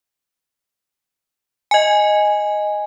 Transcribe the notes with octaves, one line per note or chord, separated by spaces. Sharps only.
D#5 G#5